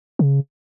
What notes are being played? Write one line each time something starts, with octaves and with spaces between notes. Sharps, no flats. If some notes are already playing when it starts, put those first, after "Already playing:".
C#3